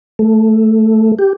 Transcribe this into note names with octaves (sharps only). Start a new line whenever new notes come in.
A3
G4